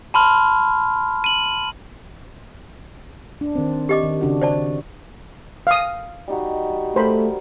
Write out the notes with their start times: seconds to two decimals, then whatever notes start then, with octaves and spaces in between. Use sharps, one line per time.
0.14 A5 B5 C6 F6
1.24 D#7 F#7
3.41 D4
3.55 D#3 C4
3.89 G4 D#5 D6
4.03 D#3
4.21 C#3 D4 F#4
4.41 C5 D5 A5
5.67 F5 D#6
6.28 G3 D#4 F#4
6.96 A3 A#4 C5 B5